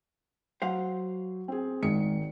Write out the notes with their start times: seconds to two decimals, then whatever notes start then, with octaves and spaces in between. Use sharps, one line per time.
0.62 F#3 C5 F5 F#5
1.48 C4 G#4
1.83 G#1 D#3 G#3 C#7